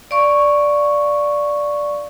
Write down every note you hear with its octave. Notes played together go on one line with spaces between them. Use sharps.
D5 F5 C#6